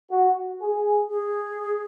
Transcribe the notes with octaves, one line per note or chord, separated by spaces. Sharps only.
F#4
G#4
G#4